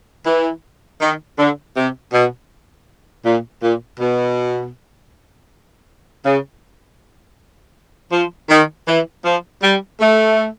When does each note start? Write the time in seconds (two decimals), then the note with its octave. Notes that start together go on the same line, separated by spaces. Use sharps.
0.26 E3
1.00 D#3
1.38 D3
1.76 C3
2.13 B2
3.25 A#2
3.62 A#2
4.00 B2
6.26 C#3
8.12 F3
8.50 D#3
8.88 E3
9.25 F3
9.63 G3
10.01 A3